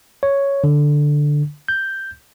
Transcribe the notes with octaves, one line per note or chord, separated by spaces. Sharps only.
C#5
D3
G6